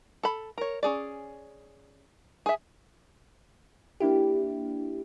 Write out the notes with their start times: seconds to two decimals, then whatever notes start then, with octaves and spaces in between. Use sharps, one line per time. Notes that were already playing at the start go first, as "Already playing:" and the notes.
0.23 A4 B5
0.58 A#4 C#5
0.83 C#4 G#4 D5
2.46 G#4 E5
4.00 A#3 D4 E4 G4